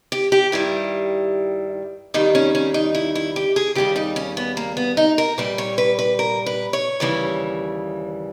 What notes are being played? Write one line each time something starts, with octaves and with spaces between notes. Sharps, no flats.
G4
G4
G2 D#3 G3 E4
D#2 D#3 G3 D#4
C#4
C#4
D#4
E4
E4
G4
G#4
D#2 C#3 G3 G4
D#4
C#4
B3
A#3
B3
D#4
A#4
A#2 G3 B4
C#5
B4
B4
A#4
B4
C#5
D#2 C#3 E3 G3